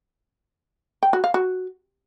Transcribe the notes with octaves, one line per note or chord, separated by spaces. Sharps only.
G5
F#4
F5
F#4